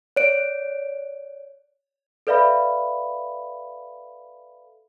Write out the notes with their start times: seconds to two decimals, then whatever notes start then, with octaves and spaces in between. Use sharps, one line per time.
0.16 C#5 D5 D7
2.27 A4 B4 D5 E5 F5 B5